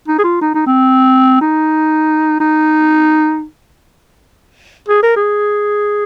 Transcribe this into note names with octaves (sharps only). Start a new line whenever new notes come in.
D#4
G#4
F4
D#4
D#4
C4
D#4
D#4
G#4
A#4
G#4